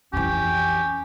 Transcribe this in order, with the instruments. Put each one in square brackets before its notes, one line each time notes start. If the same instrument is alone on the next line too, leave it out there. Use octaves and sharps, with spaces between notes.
[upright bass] F2 E3 [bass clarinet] C#4 [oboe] G4